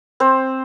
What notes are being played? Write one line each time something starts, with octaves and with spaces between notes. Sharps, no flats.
C4 C5